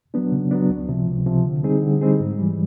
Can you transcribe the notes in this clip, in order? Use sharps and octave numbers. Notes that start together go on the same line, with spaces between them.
F#3 B3 D4
C#3
F#3 B3 D4
C#2
C3 F3
C#2
C3 F3
D3
G3 C4 D#4 G#4
D3
G3 C4 D#4 G#4
G#2
E3 G3